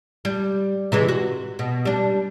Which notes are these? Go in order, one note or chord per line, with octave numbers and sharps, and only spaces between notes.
G3
C3 E3 G#3
F#4
B2
G3 D4